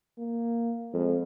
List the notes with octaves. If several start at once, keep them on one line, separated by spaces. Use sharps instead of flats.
A#3
F2 G#3